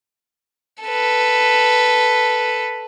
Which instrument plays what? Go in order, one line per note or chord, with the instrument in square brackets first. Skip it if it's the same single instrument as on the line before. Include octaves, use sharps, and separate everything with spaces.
[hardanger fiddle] A4 B4